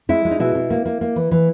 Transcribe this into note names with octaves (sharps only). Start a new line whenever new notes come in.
G#3 E4
G#3
D#4
B2 E4
B2
A#3
A#3
A#3
E3
E3